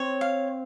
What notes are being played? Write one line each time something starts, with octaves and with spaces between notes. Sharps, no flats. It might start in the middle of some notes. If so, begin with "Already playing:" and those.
Already playing: C4 C#5
F5